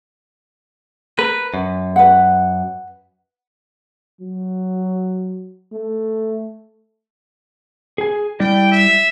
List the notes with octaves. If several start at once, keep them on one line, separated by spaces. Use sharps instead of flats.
A#4 B4
F#2
B4 F#5
F#3
A3
G#4 G#5
G3 E4 D5 G5
E5